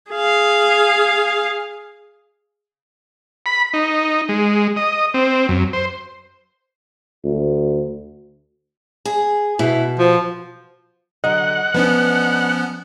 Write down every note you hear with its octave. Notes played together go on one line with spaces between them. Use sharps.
G#4 F5
B5
D#4
G#3
D#5
C4
F#2
C5
D2
G#4
B2 E4
F3
D3 F#3 D#5 F#5
F3 B3 C#4 D4 B4